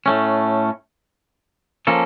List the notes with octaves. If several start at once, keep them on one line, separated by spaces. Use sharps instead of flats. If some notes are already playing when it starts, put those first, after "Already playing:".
A2 A3 C#4
F3 A#3 C#4 A4